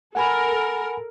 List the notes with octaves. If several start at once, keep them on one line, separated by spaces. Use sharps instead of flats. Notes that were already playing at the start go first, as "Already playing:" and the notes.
A4 A#4 F#5 G#5 B5